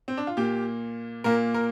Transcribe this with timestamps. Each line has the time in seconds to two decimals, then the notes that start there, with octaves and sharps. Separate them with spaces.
0.08 C4
0.17 D4
0.27 F4
0.37 A#2 A#3 G4
1.24 A#2 A#3 A#4
1.54 A#4